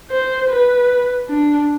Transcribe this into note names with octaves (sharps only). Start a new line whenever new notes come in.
C5
B4
D4